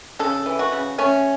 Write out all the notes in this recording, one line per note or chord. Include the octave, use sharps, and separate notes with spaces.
C#3 A4
E3
F#4
C#3
A3 C#4